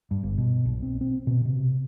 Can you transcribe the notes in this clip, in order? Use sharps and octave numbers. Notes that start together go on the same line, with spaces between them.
G2
G1
B2
B1
C4
C4
B2
C3